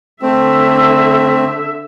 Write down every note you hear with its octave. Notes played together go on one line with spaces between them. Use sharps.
D3 A3 C4 E5